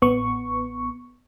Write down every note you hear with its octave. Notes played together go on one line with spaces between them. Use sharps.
A1 B3 C#6